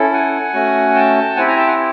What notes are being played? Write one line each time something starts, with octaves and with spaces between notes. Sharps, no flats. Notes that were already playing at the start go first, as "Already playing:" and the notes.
Already playing: C#4 E4 A4
F#5 G#5
A3 C#4 F#4
G5 A5
C4 E4 G4 F#5 G#5
G#5 A#5
G5 A5
F#5 G#5